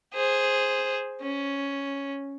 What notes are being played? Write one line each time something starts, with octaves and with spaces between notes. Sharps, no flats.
G#4 C5
C#4